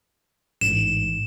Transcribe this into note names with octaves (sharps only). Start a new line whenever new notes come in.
A1 G#2 E7